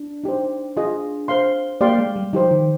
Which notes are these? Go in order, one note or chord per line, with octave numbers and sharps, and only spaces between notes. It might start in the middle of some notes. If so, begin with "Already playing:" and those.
Already playing: D4
D#4 G4 C5
F4 G#4 D#5
C5 F5 C6
A#3 G4 D5 F5 C6
G#3
G3
F3 D#4 G4 C5
D#3